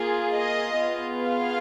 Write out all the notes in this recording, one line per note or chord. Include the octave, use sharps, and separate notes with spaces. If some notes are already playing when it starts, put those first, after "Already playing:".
Already playing: A#3 F4 G#4
D#5
B3 F4 G#4
F5